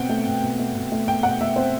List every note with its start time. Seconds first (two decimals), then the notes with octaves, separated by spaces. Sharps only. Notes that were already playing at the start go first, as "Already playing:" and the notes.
Already playing: B2 C4 F#5 G5
0.09 A3
0.27 B2
0.42 B2
0.59 A3
0.75 B2
0.92 A3
1.08 B2 G5
1.23 B2 F#5
1.41 A3 E5
1.56 C4 C5